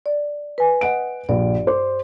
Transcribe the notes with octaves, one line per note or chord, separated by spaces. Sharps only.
D5
B4 G#5
D#5 F#5 D7
A#1 G2 D5
C5 D6